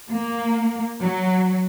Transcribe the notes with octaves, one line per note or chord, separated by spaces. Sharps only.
A#3
F#3